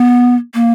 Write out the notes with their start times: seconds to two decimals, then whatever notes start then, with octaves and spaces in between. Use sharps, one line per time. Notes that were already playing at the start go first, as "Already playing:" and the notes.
Already playing: B3
0.54 A#3